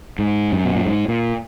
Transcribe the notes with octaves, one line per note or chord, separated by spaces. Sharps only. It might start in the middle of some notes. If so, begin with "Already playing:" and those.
G#2
F#2
B2
A#2
G#2
A#2